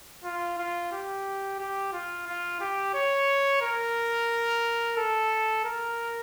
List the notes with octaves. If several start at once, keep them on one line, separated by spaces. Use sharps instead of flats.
F4
F4
G4
G4
F4
F4
G4
C#5
A#4
A4
A#4